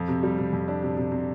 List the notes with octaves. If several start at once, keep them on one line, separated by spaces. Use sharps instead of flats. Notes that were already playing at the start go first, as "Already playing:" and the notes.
Already playing: F2
C3
G3
C3
F2
D4
C3
C3
C3